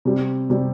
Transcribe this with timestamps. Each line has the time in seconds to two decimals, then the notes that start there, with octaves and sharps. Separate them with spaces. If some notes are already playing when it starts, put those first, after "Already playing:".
0.05 C3 G3
0.50 C3 G3